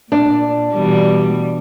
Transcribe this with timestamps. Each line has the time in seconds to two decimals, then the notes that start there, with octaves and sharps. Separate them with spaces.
0.12 A#2 D4
0.74 B2 E3 G3